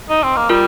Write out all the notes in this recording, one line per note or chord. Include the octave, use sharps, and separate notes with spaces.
D#4
C4
A#3
G3 F4 A#4